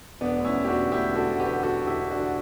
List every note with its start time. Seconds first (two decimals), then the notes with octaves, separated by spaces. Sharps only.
0.21 E1 B3 D4
0.38 D2
0.44 C#4 E4
0.57 E1
0.64 G4
0.68 D4 F#4
0.74 E1
0.92 D2 E4 G4
1.09 D3
1.16 F#4 A4
1.28 D2
1.40 G4 B4
1.46 E1
1.63 E1 F#4 A4
1.81 E1
1.87 E4 G4
1.99 D3
2.11 D4 F#4
2.17 D3